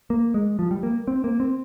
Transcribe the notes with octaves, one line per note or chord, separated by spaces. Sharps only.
A#3
G#3
F3
G3
A#3
C4
A#3
C4